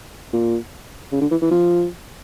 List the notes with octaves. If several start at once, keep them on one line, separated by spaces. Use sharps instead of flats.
A#2
C#3
D3
E3
E3
F3